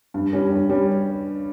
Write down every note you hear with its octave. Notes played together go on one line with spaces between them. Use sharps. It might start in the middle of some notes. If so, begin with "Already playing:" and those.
G2
G3 C#4
G2
G3 C#4